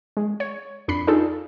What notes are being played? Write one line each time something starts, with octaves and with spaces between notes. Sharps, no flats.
G#3
C#5
F2 D4 B5 C7
D4 D#4 F4 G#4 A4